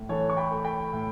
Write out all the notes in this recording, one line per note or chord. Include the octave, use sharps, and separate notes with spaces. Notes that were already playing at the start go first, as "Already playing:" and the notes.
Already playing: A2
E3 A4 C#5
C#6
G5 B5
A3
G5 B5
A2